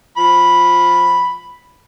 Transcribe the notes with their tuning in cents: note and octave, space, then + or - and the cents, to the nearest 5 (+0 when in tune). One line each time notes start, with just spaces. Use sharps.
F3 +10 B5 +0